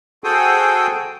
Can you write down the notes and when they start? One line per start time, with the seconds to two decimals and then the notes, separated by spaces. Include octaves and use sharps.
0.24 F#4 G#4 A4 C5 G5 D#6